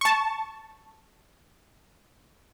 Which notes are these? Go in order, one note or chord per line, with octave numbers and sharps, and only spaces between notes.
A5 C#6